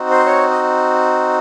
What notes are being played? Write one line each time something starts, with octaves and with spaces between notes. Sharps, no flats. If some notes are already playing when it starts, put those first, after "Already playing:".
Already playing: C4 D#4 F#4
C5
C#5
D#5